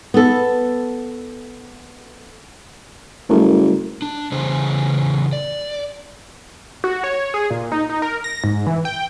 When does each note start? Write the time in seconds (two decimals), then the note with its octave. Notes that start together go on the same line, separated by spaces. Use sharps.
0.14 B3 A4
3.29 F#1 G3 A3 A#4
4.02 D4
4.32 C#3 E3 G#4 C5
5.33 D5
6.84 F#4
7.04 C#5
7.34 G#4
7.50 A#2
7.72 D#4
7.89 D#4
8.02 A#4
8.24 A#6
8.44 G#2
8.67 E3
8.85 G5